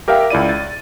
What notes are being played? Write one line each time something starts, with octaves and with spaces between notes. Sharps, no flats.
G4 A#4 E5 F5 G5
C#2 E4 D5 D#7
A6